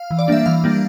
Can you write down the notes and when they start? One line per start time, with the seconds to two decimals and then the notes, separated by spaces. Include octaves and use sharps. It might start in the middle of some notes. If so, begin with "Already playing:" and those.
Already playing: F5
0.11 E3
0.19 D5
0.28 G3 A#3 D4 E5
0.46 E3 F5
0.64 G3 A#3 D4